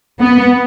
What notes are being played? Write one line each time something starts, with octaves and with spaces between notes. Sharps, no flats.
B3